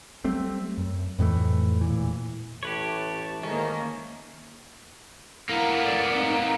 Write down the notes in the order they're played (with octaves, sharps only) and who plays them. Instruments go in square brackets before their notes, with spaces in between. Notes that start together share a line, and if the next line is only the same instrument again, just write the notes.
[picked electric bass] F#3 G3 A3 C4
F#2
F2 A2 E3 A3
E1 A#2 E3
[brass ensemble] A1 A3 A5 [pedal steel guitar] G4 B4 C#5
[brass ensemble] G#2 A3 D#4 [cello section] D#3 A#3 [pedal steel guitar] C#4
[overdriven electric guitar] A#3 B3 [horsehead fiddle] E4 A#4
[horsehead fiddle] A3 D5
C4 D#4